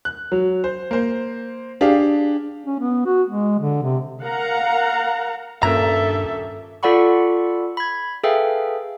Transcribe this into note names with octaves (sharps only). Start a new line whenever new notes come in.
F#6
F#3
C5
A#3 C5
D4 G4 G#4 F5
C#4
B3
F#4
G#3
D3
C3
A#4 F5 F#5 A#5
D#1 G2 A#3 C#4 A4 E5 A#5
F4 A4 D5 F#5 B5 C#6
B5 G#6
G#4 A4 B4 E5 F5 G5